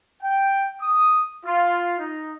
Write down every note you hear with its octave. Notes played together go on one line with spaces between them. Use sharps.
G5
D#6
F4
D#4